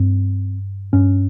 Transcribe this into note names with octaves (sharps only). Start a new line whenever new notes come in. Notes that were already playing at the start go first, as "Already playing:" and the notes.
Already playing: G2 C4
G2 C#4